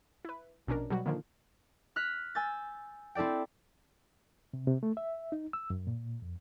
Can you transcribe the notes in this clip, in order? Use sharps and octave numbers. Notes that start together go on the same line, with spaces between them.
E4 B4
A#1 B2 C#4 D4 A#4
B2 F#3 G3 F#4
A#2 D3 D#3 F3 A#3
F6 F#6 B6
G#5 E6 G6 A6
C4 E4 A4 D5 G5
C3
C3
A3
E5
D#4
E6
F#2
A#2
F2